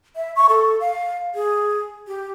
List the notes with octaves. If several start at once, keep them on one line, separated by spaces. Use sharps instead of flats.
E5
C#6
A4
F5
G#4
G4